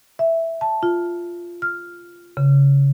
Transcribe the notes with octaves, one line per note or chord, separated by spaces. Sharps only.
E5
A5
F4
F6
C#3